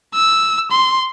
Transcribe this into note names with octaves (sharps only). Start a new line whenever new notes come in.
E6
C6